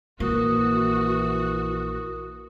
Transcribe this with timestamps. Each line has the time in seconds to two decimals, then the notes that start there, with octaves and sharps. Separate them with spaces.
0.20 A#1 E3 A#3 F#4 A#4 D#6